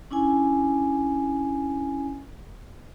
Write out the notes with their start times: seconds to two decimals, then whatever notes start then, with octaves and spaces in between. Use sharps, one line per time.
0.11 C#4 D4 E4 G#5